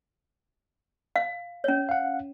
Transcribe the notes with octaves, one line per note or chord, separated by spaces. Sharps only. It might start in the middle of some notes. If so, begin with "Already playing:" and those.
F5
C#4 C#5
F5 F#5